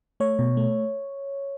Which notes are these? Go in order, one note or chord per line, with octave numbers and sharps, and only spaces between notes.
A3 C#5
B2
A3